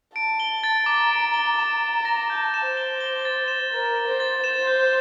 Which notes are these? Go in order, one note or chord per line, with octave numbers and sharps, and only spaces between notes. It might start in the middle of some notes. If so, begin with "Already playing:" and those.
A5 D7
G7
A6
A#5 D6
D7
G7
A#5 E7
G7
A#6
A5 G6
E7
C5
G7
G7
A6
E7
A#4 A6
G7
C5
A6
C5 E7
G6